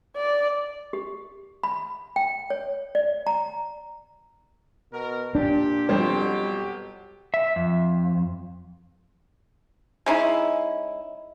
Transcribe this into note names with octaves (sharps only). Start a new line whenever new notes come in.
D5
G4
B5
G5
C#5
D5
A#5
B2 A#4
A#2 D4 G4
F2 B2 F#3 G3 G4 C5
E5
F2
G#3 C#4 D#4 E4